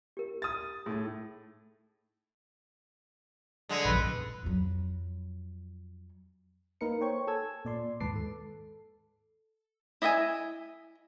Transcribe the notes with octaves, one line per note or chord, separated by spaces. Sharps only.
G4 A#4
D#6 A6
A2 D#4 G#4
D3 G#3
A#1 F#2 B4
F2 F#3
A#3 D#4 A#4 B4 C#7
C5 C#5 G5 C#6
A4 G#5 A5 E6 G#6
A#2 D5 C6
D#2 G#2 B4 A5 D6 C7
A4
E4 D#5 E5 G5 G#5